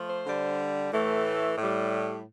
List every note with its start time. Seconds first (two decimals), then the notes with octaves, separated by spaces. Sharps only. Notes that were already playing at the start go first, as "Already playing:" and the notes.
Already playing: F3 A3
0.09 C5
0.26 D3 G3
0.91 A2 E3 A3
1.56 A2
1.62 G3